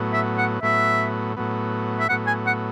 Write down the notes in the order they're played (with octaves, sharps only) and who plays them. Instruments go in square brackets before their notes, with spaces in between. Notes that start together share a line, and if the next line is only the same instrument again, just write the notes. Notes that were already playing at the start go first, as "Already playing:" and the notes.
Already playing: [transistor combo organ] A2 F#3 B3
[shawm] E5
F#5
[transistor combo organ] A2 F#3 B3 [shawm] E5
[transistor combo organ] A2 F#3 B3
[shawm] E5
[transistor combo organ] A2 F#3 B3 [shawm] F#5
[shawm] G#5
F#5